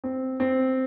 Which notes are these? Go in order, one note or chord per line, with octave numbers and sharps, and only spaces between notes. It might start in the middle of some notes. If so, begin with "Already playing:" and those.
C4
C4